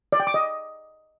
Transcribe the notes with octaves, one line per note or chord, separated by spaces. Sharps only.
D5
G5
D6
D#5